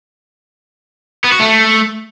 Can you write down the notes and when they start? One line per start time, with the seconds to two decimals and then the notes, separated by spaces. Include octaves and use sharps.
1.24 B3
1.32 F#4
1.40 A3